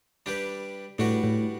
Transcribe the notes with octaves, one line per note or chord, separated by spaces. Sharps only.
G3 D4 G4 B4
A2 G3 D4 F#4 B4
A2